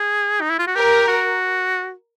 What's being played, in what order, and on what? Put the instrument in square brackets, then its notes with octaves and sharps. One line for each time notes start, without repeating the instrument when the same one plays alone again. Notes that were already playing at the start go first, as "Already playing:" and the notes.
Already playing: [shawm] G#4
D#4
E4
F4
F#4
[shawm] G4 [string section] A#4
[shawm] F#4